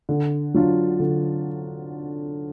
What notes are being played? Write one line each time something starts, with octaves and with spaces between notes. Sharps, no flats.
D3
F#3 D4 F4
D3